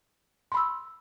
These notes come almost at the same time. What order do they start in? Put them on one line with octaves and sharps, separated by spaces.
C6 B5 E6